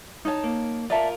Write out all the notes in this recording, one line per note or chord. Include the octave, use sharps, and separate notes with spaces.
D#4 C#5 A5
A#3
F4 A#4 D5 E5 A5